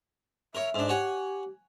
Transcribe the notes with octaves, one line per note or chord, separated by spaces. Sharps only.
A#4 C#5 E5
G#2 D4
G4 C#5 F#5 G#5